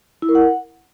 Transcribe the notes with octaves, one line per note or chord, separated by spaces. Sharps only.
E4
A#4
F#5